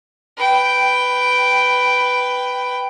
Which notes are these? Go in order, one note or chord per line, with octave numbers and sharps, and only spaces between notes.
B4 G5